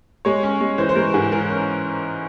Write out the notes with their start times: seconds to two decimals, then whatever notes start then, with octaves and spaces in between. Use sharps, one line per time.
0.25 G#3 C#5
0.43 C#4
0.61 G#3
0.78 E3 C5
0.89 C5
0.96 G#3 A#4
1.14 G#2 G#4
1.32 E3 A#4
1.50 C#4